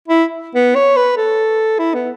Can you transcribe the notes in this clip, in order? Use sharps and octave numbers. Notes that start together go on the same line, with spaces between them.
E4
B3
C#5
B4
A4
E4
B3